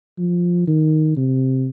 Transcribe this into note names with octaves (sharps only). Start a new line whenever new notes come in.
F3
D#3
C3